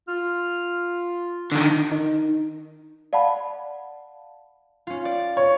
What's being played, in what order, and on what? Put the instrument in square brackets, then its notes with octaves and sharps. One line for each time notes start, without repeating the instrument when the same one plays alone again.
[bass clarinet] F4 [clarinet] F6
[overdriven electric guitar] D3 D#3 [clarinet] D4
[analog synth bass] D#3
[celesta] D5 F5 F#5 A5 B5
[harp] C#4 F4
D5
[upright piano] C#5